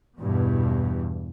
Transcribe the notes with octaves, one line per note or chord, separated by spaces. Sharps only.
E2 G2 B2